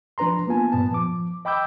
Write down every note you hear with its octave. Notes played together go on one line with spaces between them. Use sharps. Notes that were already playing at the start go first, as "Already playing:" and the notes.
F3 D4 B4 A#5 C6
A#3 B3 F4 G#5 A5
G2 A#2 B3 A5
F3 D6
D#5 G5 B5 D6 E6 G6